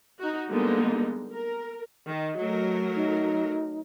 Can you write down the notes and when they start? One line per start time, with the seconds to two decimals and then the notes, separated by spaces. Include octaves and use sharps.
0.19 D#4 F#4
0.49 D3 G3 G#3 A#3 B3 D#4
1.32 A#4
2.08 D#3 D#5
2.39 F#3 A3 A#4
2.96 D#4